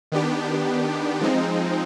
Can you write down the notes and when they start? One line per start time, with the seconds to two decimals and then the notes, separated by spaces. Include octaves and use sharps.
0.12 D#3 B3 D4 G4
1.21 F3 G#3 C4 D#4